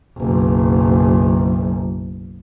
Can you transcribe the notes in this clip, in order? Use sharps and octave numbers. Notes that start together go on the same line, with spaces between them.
F#1 B1